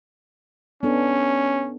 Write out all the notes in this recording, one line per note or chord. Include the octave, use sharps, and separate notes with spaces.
B3 C#4 D4 A4